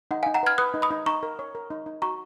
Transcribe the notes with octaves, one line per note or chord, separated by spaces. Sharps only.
D#4 F#5
D#4 F5 G#5
F#5 A#5
B4 F6 G#6
B4 D#6 F#6
D#4
B5 D#6
D#4
D#4 A#5 C#6
A#4
C#5
A#4
D#4
D#4
F#4 A#5 C#6